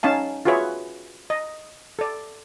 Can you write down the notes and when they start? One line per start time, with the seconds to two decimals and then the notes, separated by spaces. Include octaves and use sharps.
0.03 C#4 D#4 F5 A5
0.45 F4 F#4 G#4 B4 C#5 E5
1.30 D#5
1.99 A4 D5